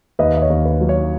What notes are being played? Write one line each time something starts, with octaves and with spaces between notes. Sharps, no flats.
D#2 B4 D#5
D#5
C#5
D#2
B4
F#3
C#5